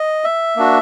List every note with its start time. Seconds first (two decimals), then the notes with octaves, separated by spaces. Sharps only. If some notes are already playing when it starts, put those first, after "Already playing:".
Already playing: D#5
0.24 E5
0.56 A#3 D4 F#4